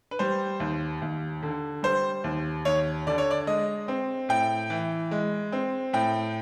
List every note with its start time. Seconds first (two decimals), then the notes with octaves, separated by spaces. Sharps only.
0.11 B4
0.19 G3 C5
0.60 D#2
1.02 D#2
1.43 D3
1.83 G3 C5
2.24 D#2
2.65 D#2 C#5
3.07 D3 D5
3.18 C#5
3.31 D5
3.47 G#3 D#5
3.88 C4
4.29 A2 G5
4.70 E3
5.11 G#3
5.52 C4
5.93 A2 G5